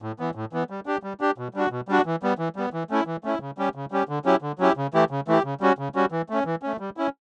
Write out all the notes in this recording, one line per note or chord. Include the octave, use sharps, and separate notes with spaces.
A2
E3 B3
A2
E3 B3
G3
D4 G4
G3
D4 G4
B2
G3 D4 F#4
B2
G3 D4 F#4
E3
G3 B3
E3
G3 B3
E3
A3 C#4 E4
E3
A3 C#4 E4
C#3
G3 C#4 G4
C#3
G3 C#4 G4
D3
F#3 C#4 E4 G4
D3
F#3 C#4 E4 G4
C#3
E3 A3 E4 G4
C#3
E3 A3 E4 G4
C#3
G3 C#4 F#4
C#3
G3 C#4 F#4
E3
A3 C#4
E3
A3 C#4
G3
C#4 E4